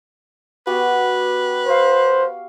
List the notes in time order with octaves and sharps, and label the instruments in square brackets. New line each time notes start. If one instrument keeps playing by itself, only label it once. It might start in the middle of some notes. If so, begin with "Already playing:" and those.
[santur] B3 F#4 G4 [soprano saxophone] B4
[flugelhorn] C5 [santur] C#5 F5